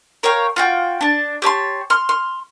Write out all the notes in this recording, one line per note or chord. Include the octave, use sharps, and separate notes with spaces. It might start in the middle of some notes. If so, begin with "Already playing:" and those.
A#4 C#5 F5 G5
F4 F#4 G5
D4 A5
G4 C#5 A5 C6
C6 F6
C6 F6